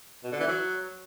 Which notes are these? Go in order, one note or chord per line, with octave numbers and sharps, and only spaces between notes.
B2
D3
E3
F#3